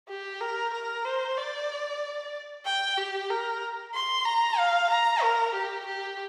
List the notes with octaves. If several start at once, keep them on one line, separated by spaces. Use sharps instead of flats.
G4
A#4
A#4
C5
D5
G5
G4
A#4
C6
A#5
F5
A#5
A#4
G4
G4